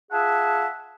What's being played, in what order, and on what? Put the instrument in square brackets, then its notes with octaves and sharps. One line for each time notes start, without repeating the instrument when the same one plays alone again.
[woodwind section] F4 G#4 E5 F#5 A5